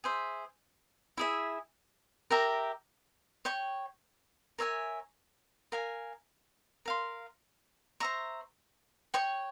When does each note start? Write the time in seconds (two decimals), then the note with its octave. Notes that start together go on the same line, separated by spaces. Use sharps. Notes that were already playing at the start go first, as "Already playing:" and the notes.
0.04 G#4 C5 E5
1.17 E4 G#4 E5
2.30 G4 A#4 E5 A#5
3.45 C#5 G5 C#6
4.59 A#4 C#5 E5 G#5
5.72 A#4 F5 G#5
6.86 A#4 F5 C6
8.00 C5 E5 A#5 C#6
9.14 C#5 G5 C#6